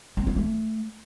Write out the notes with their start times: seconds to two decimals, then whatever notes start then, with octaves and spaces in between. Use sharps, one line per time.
0.17 C4
0.27 F4
0.36 A3